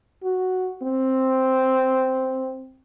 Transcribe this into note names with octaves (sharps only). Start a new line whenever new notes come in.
F#4
C4